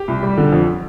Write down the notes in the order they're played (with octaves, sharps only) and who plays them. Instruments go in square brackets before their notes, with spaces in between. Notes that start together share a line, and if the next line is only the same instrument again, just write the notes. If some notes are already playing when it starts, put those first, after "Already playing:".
Already playing: [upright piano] G4
C2
G3
D3
F2